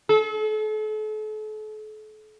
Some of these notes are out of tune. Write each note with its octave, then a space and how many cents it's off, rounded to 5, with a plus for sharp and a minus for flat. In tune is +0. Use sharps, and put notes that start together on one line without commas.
A4 -40